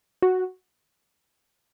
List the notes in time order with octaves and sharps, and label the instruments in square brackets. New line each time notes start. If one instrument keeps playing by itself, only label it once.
[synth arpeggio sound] F#4